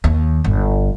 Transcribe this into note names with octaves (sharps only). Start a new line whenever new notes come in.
D#2
G1